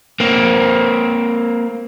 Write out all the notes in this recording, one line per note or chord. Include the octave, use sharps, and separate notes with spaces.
A#3 C4